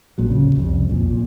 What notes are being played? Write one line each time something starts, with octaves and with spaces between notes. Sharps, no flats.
A#1 A#2 F#3
D1 C#3
C2 F2
B1 F2 A#2
A#2